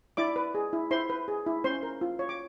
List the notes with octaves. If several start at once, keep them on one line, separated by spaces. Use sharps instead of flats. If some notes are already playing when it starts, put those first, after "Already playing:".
E4 D5 D6
B4
G#4
E4
E4 C5 C6
B4
G#4
E4
C#4 C5 C6
A#4
F4
C#5
D6